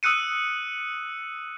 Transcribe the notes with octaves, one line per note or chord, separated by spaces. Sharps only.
D#6 E6 F#6 C#7 D#7